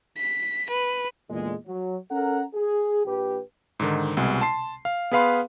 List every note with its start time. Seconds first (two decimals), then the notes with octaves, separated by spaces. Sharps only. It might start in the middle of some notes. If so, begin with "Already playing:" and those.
0.17 B6
0.70 B4
1.30 E2 A#2 D3 G#3
1.67 F#3
2.11 C#4 A4 A#4 F#5 A#5
2.54 G#4
3.06 A#1 G4 B4
3.80 G#2 D3 D#3
4.17 C2 B2 G#3
4.41 A5 C6 C7
4.85 F5
5.11 B3 G#4 B4 F5 B5 C6